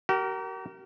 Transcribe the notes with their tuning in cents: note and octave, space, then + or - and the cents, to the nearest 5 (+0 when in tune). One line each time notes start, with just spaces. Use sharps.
G4 -45 A#4 +0